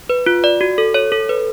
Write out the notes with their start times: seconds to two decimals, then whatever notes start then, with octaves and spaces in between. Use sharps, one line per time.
0.10 B4
0.26 F4
0.44 D5
0.61 F#4
0.78 A4
0.94 C#5
1.12 A4
1.29 B4